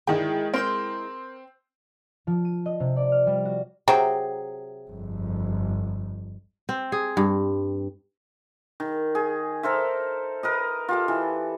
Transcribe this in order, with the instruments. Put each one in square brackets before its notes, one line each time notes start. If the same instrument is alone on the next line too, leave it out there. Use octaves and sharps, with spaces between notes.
[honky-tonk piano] D#3 G5 [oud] G#3 E4
[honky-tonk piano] C4 [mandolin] A#4 C6 G6
[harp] F3
D#7
D#5
C3
D5
F6
G3
F#4
[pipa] C3 F#3 [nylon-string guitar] G#4 G5
[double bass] G1 F2
[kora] C4
G#4
G2
[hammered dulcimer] D#3
G#4
A4 A#4 C5 E5
A#4 B4 D#5
F4 G4 A4
E3